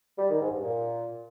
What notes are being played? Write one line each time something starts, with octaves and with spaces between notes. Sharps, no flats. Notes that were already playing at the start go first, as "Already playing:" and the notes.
G3
D#3
G#2
G2
A#2